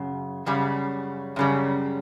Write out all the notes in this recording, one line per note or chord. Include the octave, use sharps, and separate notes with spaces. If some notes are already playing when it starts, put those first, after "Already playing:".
Already playing: F#2 C#3
F#2 C#3 G3
F#2 C#3 G3